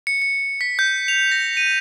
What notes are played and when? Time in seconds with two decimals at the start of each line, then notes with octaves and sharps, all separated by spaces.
0.07 C#7
0.22 C#7
0.61 B6
0.79 G6
1.08 F7
1.32 A#6
1.57 D#7